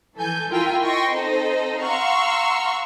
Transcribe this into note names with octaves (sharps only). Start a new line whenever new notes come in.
E3 A4 G#5 G6
E4 F4 A#4 G5 G#5
D#5 G5 C6 C#6 A#6
C4 D#4 A4 C5 D#5
F5 F#5 A#5 C6 C#6 E6